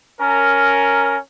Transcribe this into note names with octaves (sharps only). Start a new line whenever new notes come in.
C#4 A#4